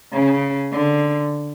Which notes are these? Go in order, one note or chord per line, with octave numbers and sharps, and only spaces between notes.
C#3
D3